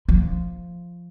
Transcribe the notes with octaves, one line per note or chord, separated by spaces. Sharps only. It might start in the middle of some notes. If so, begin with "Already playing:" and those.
F3